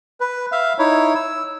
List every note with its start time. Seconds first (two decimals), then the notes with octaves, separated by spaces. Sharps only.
0.20 B4
0.52 E5 F5
0.79 D#4 E4 C#5
1.15 E6